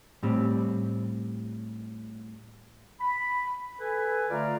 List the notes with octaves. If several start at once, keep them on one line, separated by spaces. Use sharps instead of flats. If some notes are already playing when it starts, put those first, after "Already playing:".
A2 G3 C4
B5
A4 B4 G#5
D3 A3 F4 D5 F5 A#5